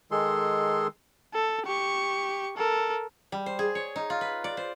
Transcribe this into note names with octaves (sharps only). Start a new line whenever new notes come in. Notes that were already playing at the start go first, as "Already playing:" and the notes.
D#3 G#3 G#4 A4 C6
A4
G4 C#6
A4 A#4
G3
C5
G#4
C#5
D#4
F4
B4
D5
C5